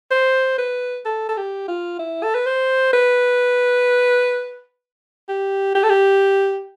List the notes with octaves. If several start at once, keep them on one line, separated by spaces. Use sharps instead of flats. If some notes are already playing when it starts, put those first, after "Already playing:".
C5
B4
A4
A4
G4
F4
E4
A4
B4
C5
B4
G4
G4
A4
G4